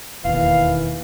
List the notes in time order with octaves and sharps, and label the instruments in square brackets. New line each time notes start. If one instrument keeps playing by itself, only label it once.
[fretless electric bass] E1 D#2 [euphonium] E3 [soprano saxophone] F5